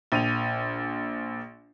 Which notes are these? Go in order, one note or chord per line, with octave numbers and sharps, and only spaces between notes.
A#1 D#7 F7